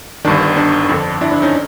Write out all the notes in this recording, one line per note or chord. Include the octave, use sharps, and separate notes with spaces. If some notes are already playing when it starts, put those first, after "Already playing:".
G1 G2 D#3 D4
D4
F2 D3
D4 E4
D4
C#4 D#4